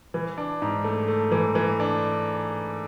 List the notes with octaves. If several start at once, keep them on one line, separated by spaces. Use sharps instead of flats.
E3
D4
G#2
A3
A3
E3
E3
D4